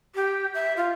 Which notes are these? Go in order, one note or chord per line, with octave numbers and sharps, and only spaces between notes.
G4
E5
F4